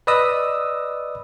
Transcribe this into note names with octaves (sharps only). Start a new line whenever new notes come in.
B4 D5 D#5 B5 D#6 E6